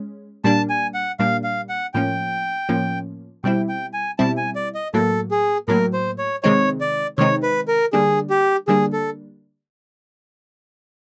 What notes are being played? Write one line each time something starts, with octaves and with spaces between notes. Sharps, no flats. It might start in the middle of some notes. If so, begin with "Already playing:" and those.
Already playing: G#3 C#4
A#2 G3 A#3 D4 A5
G#5
F#5
A#2 G3 A#3 D4 F5
F5
F#5
A2 F3 A#3 C#4 G5
A2 F3 A#3 C#4
B2 G3 C4 E4 G5
G5
G#5
B2 G3 C4 E4 A5
G#5
D5
D#5
A2 F#3 A#3 A4
G#4
A2 F#3 A#3 A#4
C5
C#5
C3 D#3 G#3 C4 D#4 C#5
D5
C3 D#3 G#3 C4 D#4 C#5
B4
A#4
D3 G3 A#3 D4 G#4
G4
D3 G3 A#3 D4 G#4
A4